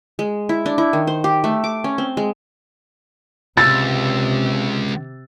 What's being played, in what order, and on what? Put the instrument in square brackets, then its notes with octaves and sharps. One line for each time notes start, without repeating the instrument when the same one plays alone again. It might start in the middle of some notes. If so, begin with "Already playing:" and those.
[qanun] G#3
E4
D4
E4
D#3
C5
G4
A3
D6
C#4
C4
G#3
[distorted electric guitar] C#2 [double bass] C3 [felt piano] E6 A6